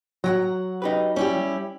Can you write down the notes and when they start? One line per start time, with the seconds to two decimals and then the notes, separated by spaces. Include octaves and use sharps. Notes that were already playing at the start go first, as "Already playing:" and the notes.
0.24 F#3 F#5 G5 A#5
0.82 D#4 G4 B4
1.16 G3 C#4 E4 G4